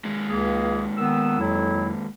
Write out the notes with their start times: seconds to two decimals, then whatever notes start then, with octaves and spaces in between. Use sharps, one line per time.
0.05 D#2 G#3
0.29 C#2 A#3 G#4
0.97 D#3 B3 E6
1.39 F2 F#3 E4